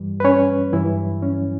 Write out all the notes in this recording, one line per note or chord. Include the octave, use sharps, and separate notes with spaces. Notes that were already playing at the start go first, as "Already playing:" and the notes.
Already playing: G2 E3 G3
B4
C#4 C#5
G2 E3 F#3 E4
C#4